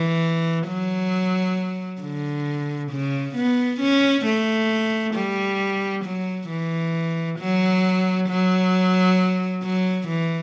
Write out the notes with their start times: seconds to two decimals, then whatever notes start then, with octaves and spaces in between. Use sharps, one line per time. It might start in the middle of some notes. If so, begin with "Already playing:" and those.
Already playing: E3
0.67 F#3
2.02 D3
2.91 C#3
3.36 B3
3.81 C#4
4.26 A3
5.15 G3
6.04 F#3
6.49 E3
7.39 F#3
8.29 F#3
9.63 F#3
10.08 E3